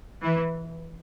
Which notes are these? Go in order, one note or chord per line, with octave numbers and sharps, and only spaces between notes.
E3